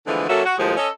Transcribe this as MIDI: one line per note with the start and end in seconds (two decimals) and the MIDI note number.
0.07 0.28 50
0.07 0.28 52
0.07 0.28 53
0.07 0.28 56
0.07 0.28 57
0.07 0.28 59
0.28 0.44 54
0.28 0.44 58
0.28 0.44 61
0.28 0.44 66
0.28 0.44 69
0.28 0.44 76
0.45 0.56 66
0.58 0.76 39
0.58 0.76 45
0.58 0.76 53
0.58 0.76 56
0.77 0.88 61
0.77 0.88 69
0.77 0.88 75